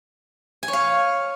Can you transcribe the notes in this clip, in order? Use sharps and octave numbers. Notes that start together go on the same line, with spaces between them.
G#5
C#5
F5